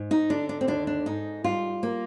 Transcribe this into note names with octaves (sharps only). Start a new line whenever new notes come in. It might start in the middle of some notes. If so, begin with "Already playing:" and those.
Already playing: G#2
D#4
D3 D4
D4
C4
D#2 D4
D4
G#2 D#4
G3 F4
A#3